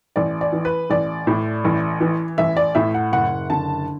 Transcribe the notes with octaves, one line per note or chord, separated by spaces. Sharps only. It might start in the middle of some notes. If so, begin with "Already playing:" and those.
A1 D5
D5
E3
B4
A1 D5
A2
A1
E3
A1 E5
D5
A2 E5
F#5
F#1 F#5
D3 A5